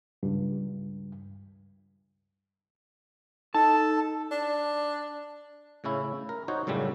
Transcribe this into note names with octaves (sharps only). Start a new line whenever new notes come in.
C#2 G2
D#4 A4 A5
D4
A2 C#3 C#4 E4
A#4
D#4 F#4 C5 C#5
F#2 A2 C#3 G3 A3